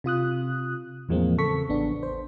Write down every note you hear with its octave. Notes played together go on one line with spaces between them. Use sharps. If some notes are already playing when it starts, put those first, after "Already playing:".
C3 F4 D#6 F#6
E2 A2 F3 G#3 A#3 C4
C#3 A4 C#6 B6
A1 B3 D4
C5